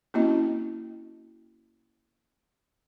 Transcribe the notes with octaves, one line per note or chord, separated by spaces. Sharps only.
A#3 C4 C#4 E4 F#4 D#5